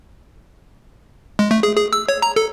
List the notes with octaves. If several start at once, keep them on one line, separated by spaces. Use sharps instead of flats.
G#3
A3
G#4
G#4
E6
C#5
A#5
A4